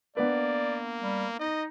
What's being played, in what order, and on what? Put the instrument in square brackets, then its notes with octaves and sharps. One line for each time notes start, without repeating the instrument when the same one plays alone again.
[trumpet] A#3 [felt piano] B3 D4 B4 [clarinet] D5
[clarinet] G3
[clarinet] D#4 [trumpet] D#5